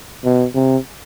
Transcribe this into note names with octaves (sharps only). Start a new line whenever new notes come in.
B2
C3